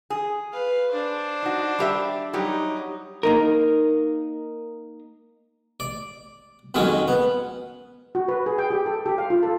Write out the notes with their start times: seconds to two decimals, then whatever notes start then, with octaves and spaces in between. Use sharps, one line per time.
0.10 G#4
0.52 B4 F5
0.91 D4 C5
1.43 D#4 F#4
1.79 G3 G4 E5
2.33 F#3 G3 D#4 G4
3.23 A#3 D#4 A#4
5.80 D5
6.74 F2 D#3 F#3 G#3 C#4
7.08 B3
8.15 F#4
8.28 B4
8.46 G#4
8.58 G5
8.70 G4
8.86 A4
9.06 G4
9.18 F5
9.30 F4
9.43 A4